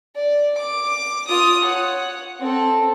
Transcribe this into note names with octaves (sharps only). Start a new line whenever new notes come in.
D5
D6
F4 D#6
C#5 F#5
C4 A4